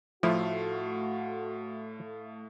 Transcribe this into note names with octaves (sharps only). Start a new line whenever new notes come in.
A2 F3 A3 E4 F#4 F5 C6